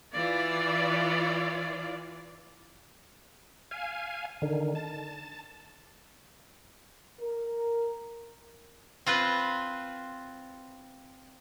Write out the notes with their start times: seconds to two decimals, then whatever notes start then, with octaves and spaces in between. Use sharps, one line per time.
0.13 E3 F4 D5
3.71 F5 G#5
4.42 D3 D#3
4.75 A5
7.20 A#4
9.06 C4 F4 B4